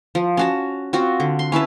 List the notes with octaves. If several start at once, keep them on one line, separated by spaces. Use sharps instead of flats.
F3
C#4 F#4 A5
C4 F4 F#4
D3
C6
C#4 E4 B4 A5